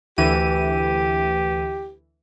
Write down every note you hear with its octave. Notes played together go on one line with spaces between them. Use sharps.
D2 E3 G4 D#7